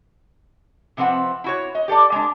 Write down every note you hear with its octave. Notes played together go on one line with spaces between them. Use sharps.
C3 F3 C4 B4 F#5
E4 F#4 C#5
D#5
G4 A4 C5 D5
G#3 D4